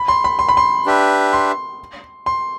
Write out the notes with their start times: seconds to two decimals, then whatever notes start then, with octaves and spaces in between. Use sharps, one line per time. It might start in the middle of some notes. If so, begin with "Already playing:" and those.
Already playing: B5
0.08 C6
0.24 B5
0.39 C6
0.49 B5
0.57 C6
0.86 D4 G4 B4 E5
1.33 C6
2.26 C6